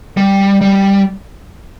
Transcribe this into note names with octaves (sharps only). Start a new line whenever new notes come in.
G3
G3